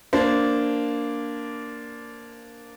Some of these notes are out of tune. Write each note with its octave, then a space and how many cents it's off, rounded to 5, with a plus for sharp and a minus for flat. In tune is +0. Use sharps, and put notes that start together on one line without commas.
A#3 +0 D4 -10 C5 -15